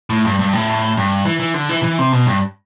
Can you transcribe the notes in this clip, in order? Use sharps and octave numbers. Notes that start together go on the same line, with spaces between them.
A2
G2
G2
A2
G2
E3
E3
D3
E3
E3
C3
B2
G2